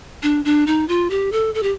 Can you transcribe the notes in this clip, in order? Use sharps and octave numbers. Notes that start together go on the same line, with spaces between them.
D4
D4
D#4
F4
G4
A4
A4
G4